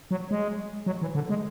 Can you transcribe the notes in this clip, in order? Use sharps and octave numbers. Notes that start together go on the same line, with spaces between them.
F#3
G#3
F#3
E3
D3
G#3